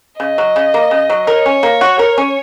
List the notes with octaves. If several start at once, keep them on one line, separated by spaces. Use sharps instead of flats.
C#3 D#5
F#3
C#3
A#3
C#3
F#3
A#4 C#5
C#4
A#3
F#4
A#4
C#4